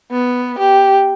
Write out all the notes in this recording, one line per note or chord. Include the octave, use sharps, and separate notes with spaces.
B3
G4